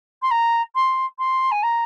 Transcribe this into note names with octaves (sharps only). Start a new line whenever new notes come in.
C6
A#5
C6
C6
G#5
A#5